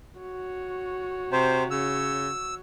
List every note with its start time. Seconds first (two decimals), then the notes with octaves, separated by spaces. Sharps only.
0.20 F#4 C#5
1.33 C3 C5
1.71 C#3 E6